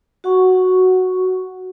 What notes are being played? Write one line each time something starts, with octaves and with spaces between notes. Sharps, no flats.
F#4 F#5 C#6